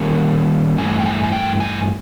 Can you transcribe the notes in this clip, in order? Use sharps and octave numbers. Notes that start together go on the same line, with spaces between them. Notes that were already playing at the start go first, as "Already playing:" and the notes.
Already playing: D#3 G3 A#3 C#4
G2 E3 A3 G#5
G5
G#5
G#5
G5
G#5